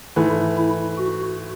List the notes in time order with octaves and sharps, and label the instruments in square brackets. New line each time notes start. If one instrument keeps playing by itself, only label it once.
[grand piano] G#2 E3 A3 [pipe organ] E4
[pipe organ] E4
F#4